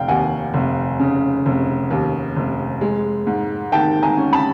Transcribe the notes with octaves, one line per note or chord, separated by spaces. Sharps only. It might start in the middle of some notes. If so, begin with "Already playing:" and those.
Already playing: F1 D5 F5 G5
D#2 F#5 G#5
F1
C#3
F1
D#2
F1
G#3
G#2
D#3 G5 A5
G#5 A#5
C#4
A5 B5